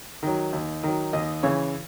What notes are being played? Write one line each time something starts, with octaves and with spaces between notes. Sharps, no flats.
D#3 F#3
D#2
D#3 F#3
D#2 D#5
C#3 E3 C#5